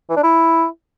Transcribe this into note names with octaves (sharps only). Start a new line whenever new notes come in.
E3
D4
E4